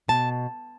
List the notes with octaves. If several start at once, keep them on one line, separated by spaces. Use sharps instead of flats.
B2 A5